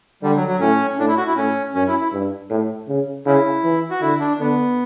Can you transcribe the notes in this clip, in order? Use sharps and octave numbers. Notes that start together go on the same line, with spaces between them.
D3 G3
F#3
F#3
A2 C#4
A2 D4
E4
F#4
E4
A2 C#4
F#2 C#4
E4
E4
G2
A2
C#3
C#3 E4
E3
F#4
D3 E4
D4
D3 B3